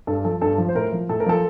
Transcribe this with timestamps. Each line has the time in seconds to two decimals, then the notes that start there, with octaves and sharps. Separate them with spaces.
0.07 G2 A4
0.24 F3 A4
0.42 G2 A4
0.58 F3
0.69 C5
0.75 A2 A#4
0.92 F3
1.09 A2 A4
1.20 A#4
1.26 F3 A4